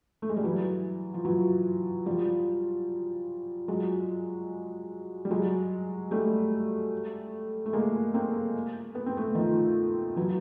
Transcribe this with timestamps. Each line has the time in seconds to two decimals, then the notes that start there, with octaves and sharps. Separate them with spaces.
0.22 A3
0.29 G#3
0.36 G3
0.44 E3 F#3
1.14 F3
1.25 E3 F#3
2.06 F3 G3
3.68 F#3 G#3
5.25 G3
5.31 F#3 G#3
6.11 G3 A3
7.66 A3
7.73 G#3 A#3
8.14 A#3 C4
8.95 B3
9.06 C4
9.17 A3 B3
9.35 D#3 F3
10.16 E3 F#3